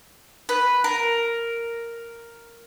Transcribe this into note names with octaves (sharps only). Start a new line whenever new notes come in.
B4
A#4